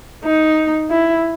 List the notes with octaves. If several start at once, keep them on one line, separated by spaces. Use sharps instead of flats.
D#4
E4